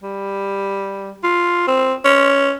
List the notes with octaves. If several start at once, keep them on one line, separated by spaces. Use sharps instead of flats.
G3
F4
C4
C#4